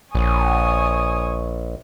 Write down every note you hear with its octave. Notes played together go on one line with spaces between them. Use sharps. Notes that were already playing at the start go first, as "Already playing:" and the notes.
A#1 C#5 G#5 D#6